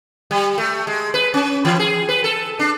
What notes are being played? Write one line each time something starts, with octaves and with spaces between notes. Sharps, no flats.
G3
A3
G#3
B4
C#4
E3
G#4
B4
A4
D4